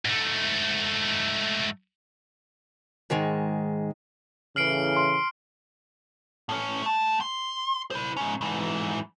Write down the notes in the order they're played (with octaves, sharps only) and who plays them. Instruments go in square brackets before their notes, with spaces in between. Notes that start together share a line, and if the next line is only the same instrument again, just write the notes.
[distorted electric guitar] G#2 A3
[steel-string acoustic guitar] G#2 D#3 G#3
[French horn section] A2 C#3 E3 [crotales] F6 C7 D7 [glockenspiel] F#7
[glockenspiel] C6
[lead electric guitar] A2 C#4
A3 A5
C6
E4 C5
G#2 C#4
G#2 E3